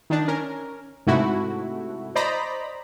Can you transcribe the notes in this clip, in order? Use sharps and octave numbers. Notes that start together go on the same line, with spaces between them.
D#3 D4
C#4 A#4
G#2 C3 A3 E4 F#4
C5 D5 D#5 A#5 B5